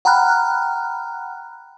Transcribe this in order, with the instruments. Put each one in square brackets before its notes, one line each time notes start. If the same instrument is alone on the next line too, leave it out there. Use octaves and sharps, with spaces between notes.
[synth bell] F#5 G5 A#5 B5 F6 F#6